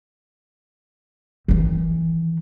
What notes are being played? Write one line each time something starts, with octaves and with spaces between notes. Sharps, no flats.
D#3 E3